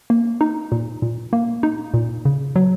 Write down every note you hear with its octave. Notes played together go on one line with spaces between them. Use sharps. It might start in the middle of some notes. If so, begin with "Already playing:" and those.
A#3
D#4
A#2
A#2
A#3
D#4
A#2
C#3
F#3